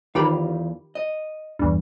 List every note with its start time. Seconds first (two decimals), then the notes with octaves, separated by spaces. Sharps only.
0.15 E2 D#3 F4 G4 B4 F5
0.95 D#5
1.59 E2 G2